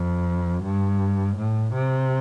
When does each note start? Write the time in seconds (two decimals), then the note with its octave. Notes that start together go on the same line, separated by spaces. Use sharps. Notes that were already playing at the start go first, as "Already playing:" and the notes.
Already playing: F2
0.64 G2
1.36 A2
1.74 C3